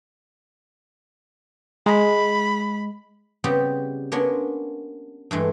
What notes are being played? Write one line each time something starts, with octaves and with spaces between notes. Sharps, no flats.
G#3 B5
C#3 G3 B3 C4 G4
A#3 B3 C#4 D4 G#5 C6
G2 E3 G#3 A3